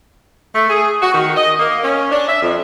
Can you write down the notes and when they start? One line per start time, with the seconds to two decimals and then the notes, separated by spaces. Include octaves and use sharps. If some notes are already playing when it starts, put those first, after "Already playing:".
0.55 A3
0.70 G#4
1.02 F#4
1.14 D#3
1.36 D#5
1.59 A#3
1.83 C#4
2.11 D4
2.28 E5
2.42 F2